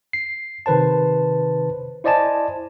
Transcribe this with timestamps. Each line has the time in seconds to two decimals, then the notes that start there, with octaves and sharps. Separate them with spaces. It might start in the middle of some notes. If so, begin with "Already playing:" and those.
0.13 C7
0.66 C3 D#3 B4 C5 A5
2.04 E4 C5 D5 D#5 G#5 A5